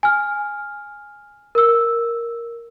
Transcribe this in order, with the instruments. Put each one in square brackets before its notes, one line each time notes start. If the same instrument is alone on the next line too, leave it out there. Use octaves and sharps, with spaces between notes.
[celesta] G#5 F6
A#4 E6